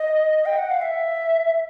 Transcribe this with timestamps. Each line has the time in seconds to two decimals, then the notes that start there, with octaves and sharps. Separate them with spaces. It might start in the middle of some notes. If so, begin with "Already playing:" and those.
Already playing: D#5
0.46 G5
0.58 F#5
0.70 F5
0.82 E5